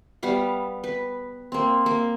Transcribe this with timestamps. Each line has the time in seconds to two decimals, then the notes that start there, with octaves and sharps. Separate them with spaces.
0.23 G3 B3 F5
0.84 B4
1.52 A#3 C4
1.86 A#3